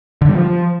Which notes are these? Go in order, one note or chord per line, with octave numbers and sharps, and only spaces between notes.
D3
G3
F3